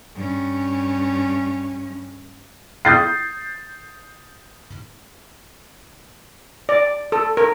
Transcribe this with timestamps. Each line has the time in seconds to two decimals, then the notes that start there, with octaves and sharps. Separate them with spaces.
0.15 G2 C#4
2.85 D#6 G6 A6 C7
6.69 D5
7.12 A4
7.37 A#4